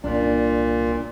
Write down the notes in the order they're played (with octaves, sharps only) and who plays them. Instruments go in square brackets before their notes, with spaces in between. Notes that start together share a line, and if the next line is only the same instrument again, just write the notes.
[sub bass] C2 [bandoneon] A#2 [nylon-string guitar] D4